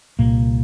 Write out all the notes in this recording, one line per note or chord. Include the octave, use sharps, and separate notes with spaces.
C2 A#2 A#3